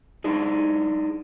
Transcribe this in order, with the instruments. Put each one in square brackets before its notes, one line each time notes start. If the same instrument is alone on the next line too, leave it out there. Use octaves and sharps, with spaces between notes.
[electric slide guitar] D4 D#4 G#4